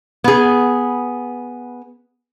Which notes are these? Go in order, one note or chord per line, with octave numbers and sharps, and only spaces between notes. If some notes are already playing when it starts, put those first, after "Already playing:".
B3 G#4